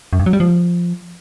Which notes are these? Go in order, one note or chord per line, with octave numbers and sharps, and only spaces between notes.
F#2
G2
F#3
G3
F3